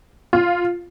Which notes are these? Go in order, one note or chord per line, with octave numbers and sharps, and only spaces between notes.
F4